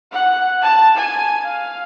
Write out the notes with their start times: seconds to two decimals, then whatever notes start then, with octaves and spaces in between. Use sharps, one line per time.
0.12 F#5
0.62 A5
0.96 G#5
1.45 F5